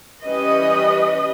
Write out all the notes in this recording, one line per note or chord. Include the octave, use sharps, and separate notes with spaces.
E3 G3 C#4 B4 D#5